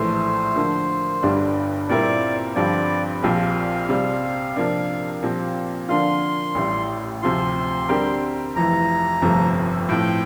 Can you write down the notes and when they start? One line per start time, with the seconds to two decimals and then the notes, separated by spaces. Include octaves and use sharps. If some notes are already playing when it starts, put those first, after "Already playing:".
Already playing: A#1 A2 E3 A3 C5
0.56 D3 F3 A#3
1.23 G1 G2 D3 G3 D4
1.89 A#2 G3 C4 E4 A#4 D5
2.56 G2 D3 F3 C4 D5
3.23 A#1 A#2 F3 C4 G4 F5
3.89 C3 G3 C4
4.56 C3 F3 A#3 D4
5.23 A#2 F3 C4 G4
5.89 D3 F3 A#3 D4 F4 C6
6.55 A1 A2 G3
7.22 D2 C3 F3 C4 F4 C6
7.89 D3 G3 C4 G4 A#4
8.56 F1 F2 E3 A#5
9.22 G1 F2 C3 F3 A3
9.89 A2 F3 C4 G5